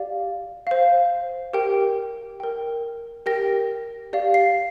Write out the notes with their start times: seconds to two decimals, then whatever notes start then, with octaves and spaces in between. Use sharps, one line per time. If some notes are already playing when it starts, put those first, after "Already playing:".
Already playing: G4 D5 F5
0.67 C5 F5
1.53 G4 A#4 G5
2.40 A#4 G5
3.26 G4 A#4 G5 A#6
4.13 G4 D5 F5
4.34 C7